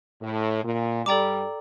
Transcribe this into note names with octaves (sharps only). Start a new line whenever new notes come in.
A2
A#2
G2 G3 A4 D5 G5 A#5 D6